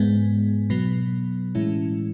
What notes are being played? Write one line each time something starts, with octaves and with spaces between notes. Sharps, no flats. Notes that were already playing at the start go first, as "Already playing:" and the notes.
Already playing: G#2 G#3 B3
B2 F#3 B3
A2 E3 G#3 C#4 E4